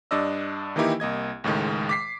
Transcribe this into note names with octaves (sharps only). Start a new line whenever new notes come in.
G2 D4 D5 D#5 E6
D#3 E3 A#3 D#4 E4 G4
C2 A#3 D#5 G#6
C#2 A2 D#3 G#3
D6 B6 C7